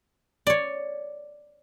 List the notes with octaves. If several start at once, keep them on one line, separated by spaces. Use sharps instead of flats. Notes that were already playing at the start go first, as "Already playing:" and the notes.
C#5 D5